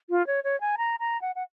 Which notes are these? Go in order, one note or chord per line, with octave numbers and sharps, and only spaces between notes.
F4
C#5
C#5
G#5
A#5
A#5
F#5
F#5